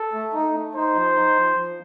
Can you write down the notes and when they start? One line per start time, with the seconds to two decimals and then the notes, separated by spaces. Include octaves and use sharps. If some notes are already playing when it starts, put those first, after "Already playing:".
Already playing: A4
0.13 A3
0.34 D#4
0.54 A3
0.75 D#4 C5
0.95 F3
1.15 D#4
1.37 F3
1.57 F3